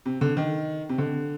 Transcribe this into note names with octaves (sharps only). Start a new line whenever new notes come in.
C3
D3
D#3
C3
D3